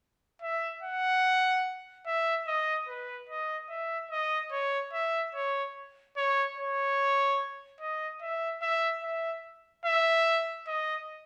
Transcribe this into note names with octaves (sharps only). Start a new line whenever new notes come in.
E5
F#5
E5
D#5
B4
D#5
E5
D#5
C#5
E5
C#5
C#5
C#5
D#5
E5
E5
E5
E5
D#5